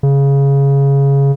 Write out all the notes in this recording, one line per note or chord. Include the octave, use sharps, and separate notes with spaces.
C#3